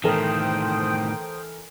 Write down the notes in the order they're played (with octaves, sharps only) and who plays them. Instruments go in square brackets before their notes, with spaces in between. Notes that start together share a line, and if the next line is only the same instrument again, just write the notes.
[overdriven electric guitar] A2 D#3 [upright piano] E3 A4 A#4 [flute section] C5 G5 D#6